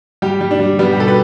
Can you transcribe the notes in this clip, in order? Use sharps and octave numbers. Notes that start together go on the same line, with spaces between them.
G3 G4
G3
D4
G3
G3 B3
G4
B2 A4
B4